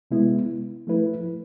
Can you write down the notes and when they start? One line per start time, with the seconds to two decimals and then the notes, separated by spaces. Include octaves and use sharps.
0.11 C3 G#3 B3 E4
0.87 F3 A3 E4 B4